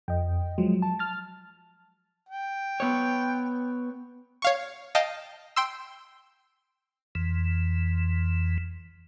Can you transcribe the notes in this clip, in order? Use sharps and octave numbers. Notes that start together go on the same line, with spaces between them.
F2 D#5 G5
F3 F#3 G#3
A5
F6 A6
G5
B3 C#5
C#5 F5 C#6
D#5 F5 G5 A5
G5 C6 E6
F2 E3